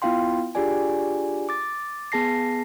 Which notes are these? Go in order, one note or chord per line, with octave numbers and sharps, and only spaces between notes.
B3 E4 F4 F5 G5 C6
D4 F4 G4 G#4 D5 G#5
D6 A6
B3 G#4 A5 A#6 C7